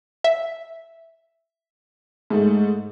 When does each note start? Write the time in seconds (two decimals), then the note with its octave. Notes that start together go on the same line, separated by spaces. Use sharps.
0.24 E5
2.30 G#2 G#3 A3